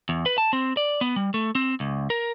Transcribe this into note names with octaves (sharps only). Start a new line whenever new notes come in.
E2
B4
A5
C4
D5
B3
G3
A3
C4
C#2
A#4